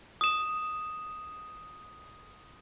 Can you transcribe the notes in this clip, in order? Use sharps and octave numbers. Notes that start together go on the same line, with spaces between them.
D#6 E7